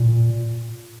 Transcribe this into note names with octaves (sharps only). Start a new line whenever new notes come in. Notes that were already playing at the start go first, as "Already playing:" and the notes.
Already playing: A#2